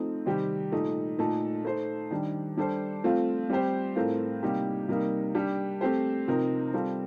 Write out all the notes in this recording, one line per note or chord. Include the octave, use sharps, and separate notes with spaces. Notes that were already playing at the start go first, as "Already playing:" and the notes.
Already playing: F3 A3 C4 D#4
C3 D#3 G3 C4 G4
A#2 A3 D#4
A#2 A3 D#4 A4
A3 D#4 A4 C5
D#3 G3 D4
G3 D4 A4 C5
F3 A3 C4 F4
G3 C4 G4 C5
A2 A3 C4 F4 A#4
C3 G3 A#3 D#4 G4
C3 G3 A#3 D#4 A#4
G3 D4 G4
A3 C4 G4 C5
C3 F3 C4 D#4 A#4
G3 C4 F4 A4